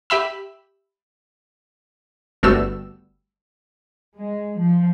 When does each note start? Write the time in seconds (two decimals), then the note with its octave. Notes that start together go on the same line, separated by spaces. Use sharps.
0.10 G4 E5 B5 E6
2.43 G1 G3 A3 B3 F#4 E6
4.16 G#3
4.59 F3